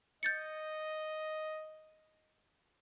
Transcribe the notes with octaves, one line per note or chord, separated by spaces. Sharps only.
D#5 G6 A6 C#7